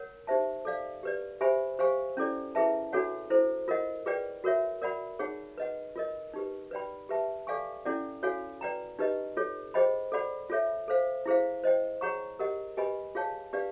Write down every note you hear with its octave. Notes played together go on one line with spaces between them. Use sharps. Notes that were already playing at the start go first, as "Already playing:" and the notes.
Already playing: A#4 C#5 F#5
D#4 G4 C5 E5 A5
A4 D5 F5
G4 B4 D5
G4 C5 E5 G#5 B5
G4 C5 F5 G#5 C#6
C#4 E4 A4 D5
E4 G#4 B4 E5 A5
D4 F#4 A4 C#5 F#5
E4 A4 C5
F4 A#4 D#5 F#5
F4 G#4 B4 D5 G5
F#4 A#4 C#5 E5
A#4 D5 F#5 B5
D#4 G#4 C#5 F#5
B4 D#5 F#5
F4 A#4 D#5
D#4 G4 B4
B4 D5 G5 B5
G4 B4 E5 A5
A4 D5 F5 G#5 C#6
C#4 E4 A4 D5 F#5
F#4 A4 C#5 F5 G#5
B4 D5 G5 A#5
D#4 G4 B4 D#5
F4 A4 C#5
G#4 C5 D#5 G5 B5
A4 D5 F#5 B5
F4 A4 C#5 E5
A4 C5 F5
E4 G#4 C5 F5
C5 D#5 G5
G#4 C#5 F#5 A#5 C#6
G4 A#4 D#5 F#5
G4 B4 D#5 G#5 B5
F4 G#4 C#5 F5 A5
D4 G4 B4 D5 F5